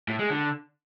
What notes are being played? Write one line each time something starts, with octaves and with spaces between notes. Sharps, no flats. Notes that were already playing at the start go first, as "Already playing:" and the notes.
A2
G#3
D3